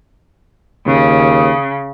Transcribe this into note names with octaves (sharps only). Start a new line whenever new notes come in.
D#2 C#3